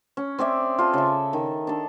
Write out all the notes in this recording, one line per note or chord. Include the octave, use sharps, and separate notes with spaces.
C#4
C4 G#4 D5 E5
F4 A4
C#3 E5
D#3
D4 A4